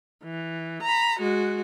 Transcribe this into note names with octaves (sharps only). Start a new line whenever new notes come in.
E3
A#5 B5
G#3 F#4